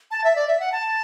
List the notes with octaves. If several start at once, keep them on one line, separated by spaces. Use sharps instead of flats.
A5
E5
D5
E5
F#5
A5